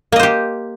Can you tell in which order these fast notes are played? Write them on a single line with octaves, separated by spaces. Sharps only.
A#3 D#5 C5 G4